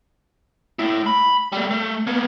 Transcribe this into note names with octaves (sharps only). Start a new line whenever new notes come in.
A3 E4
B5
G3 A3
A3
A#3 B3